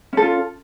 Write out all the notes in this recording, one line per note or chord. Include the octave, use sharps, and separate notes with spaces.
C#4 F4 A4